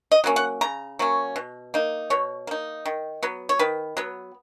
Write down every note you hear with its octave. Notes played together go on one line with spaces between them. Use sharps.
D#5
F#3 A#3 C#4
F#5
C#3 A#5
F#3 A#3 C#4
B2
A#3 D#4
B2 C#5
A#3 D#4
D#3
F#3 B3
C#5
D#3 B4
F#3 B3